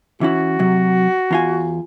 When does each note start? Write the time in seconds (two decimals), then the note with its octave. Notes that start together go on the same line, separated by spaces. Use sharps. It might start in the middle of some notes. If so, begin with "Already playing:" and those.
0.21 E3 C#4 E4 F#4
0.59 C3 F#3
1.31 E2 F4 G#5